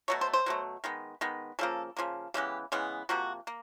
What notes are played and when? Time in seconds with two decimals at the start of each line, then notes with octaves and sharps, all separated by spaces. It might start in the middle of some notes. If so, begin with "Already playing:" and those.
0.08 B2 F#3 A3 C#5
0.21 C5
0.33 C5
0.46 B2 F#3 A3
0.84 D#3 G#3 B3
1.21 D#3 G#3 B3
1.59 C#3 F3 A#3 A4
1.97 C#3 F3 A#3
2.34 C#3 E3 G#3 B3 G4
2.72 C#3 E3 G#3 B3
3.09 C3 F3 A#3 F#4
3.47 A#3